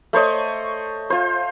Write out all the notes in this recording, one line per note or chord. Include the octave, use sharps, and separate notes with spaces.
A3 C5 C#5 D#5
F4 C5